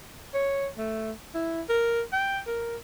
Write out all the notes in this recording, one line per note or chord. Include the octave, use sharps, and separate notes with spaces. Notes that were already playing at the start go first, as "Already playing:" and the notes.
C#5
A3
E4
A#4
G5
A#4